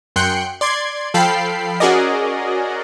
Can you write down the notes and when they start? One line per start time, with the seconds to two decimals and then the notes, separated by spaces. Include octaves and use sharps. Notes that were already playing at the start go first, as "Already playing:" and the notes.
0.16 F#2 G5 C6 F#6 G6 C#7
0.61 D5 C6 G#6
1.14 F3 A4 F5 G5 B5 C7
1.80 C#4 F#4 G#4 A#4 D5 D#5